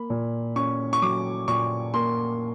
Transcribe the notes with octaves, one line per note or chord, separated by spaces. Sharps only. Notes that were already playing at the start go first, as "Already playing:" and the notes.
Already playing: A#3 B5
A#2
C#4 C#6
C#6
F#3 D6
A#2 C#6
A#3 C6